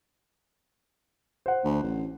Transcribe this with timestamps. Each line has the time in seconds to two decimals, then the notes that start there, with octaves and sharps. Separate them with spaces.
1.46 C5 F#5
1.64 D2
1.83 A1